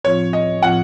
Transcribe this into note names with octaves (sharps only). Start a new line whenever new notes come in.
A2 F3 C4 F4 C#5
D#5
A2 F3 C4 F4 F#5